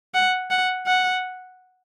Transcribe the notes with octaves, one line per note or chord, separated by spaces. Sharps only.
F#5
F#5
F#5